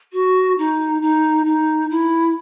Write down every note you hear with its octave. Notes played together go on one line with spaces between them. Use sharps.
F#4
D#4
D#4
D#4
E4